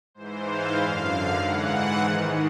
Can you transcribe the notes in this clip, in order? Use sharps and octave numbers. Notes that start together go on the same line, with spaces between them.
G#2 E3 C5
F5
F#2 D3 F5
G#2 E3 F#5
G#2 D#3